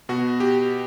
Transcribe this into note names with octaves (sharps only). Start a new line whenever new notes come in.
B2 F#4
G4